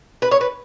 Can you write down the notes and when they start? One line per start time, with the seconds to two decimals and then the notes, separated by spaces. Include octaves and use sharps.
0.22 B4
0.31 C#5
0.41 B4